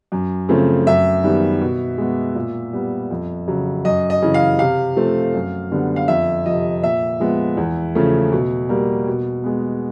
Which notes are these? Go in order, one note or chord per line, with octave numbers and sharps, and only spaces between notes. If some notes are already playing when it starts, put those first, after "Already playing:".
F#2
C#3 F3 A3 C4
F#2 E5
D#3 G3 B3
B2
G#3 B3
A#2
G3 B3
F2
C#3 F#3
F#2 D#5
D#5
C#3 E3
F5
C3 F5
F3 A3 C4
F#2
D3 G3 B3
F5
F2 E5
C3 F3 D#5
A#2 E5
F3 G#3 B3
E2
C#3 F3 A3
B2
G3 A#3
B2
G#3 B3